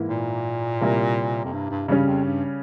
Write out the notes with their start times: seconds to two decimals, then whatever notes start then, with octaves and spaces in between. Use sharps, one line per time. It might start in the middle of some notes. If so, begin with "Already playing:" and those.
Already playing: G#2 E3 A#3 E4
0.09 A#2
0.81 C3 G3 A#3 E4
1.45 F2
1.53 G2
1.70 G2
1.88 G2 C#3 G3 C#4
2.07 F2
2.24 G2